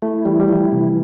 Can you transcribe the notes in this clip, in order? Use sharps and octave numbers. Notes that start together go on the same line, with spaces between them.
A3 E4
E3 G3
G3
F3 E4
C3 E3